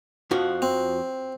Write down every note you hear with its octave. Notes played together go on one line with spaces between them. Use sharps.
F2 F3 F#4
C4